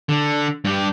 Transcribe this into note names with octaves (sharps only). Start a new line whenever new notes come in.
D3
G2 G4